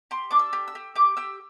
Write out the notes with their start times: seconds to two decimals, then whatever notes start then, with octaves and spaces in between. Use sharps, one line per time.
0.11 G4 C6
0.31 D4 D6
0.39 E6
0.53 G4
0.68 E6
0.75 G4
0.95 G4 D6
1.17 G4 E6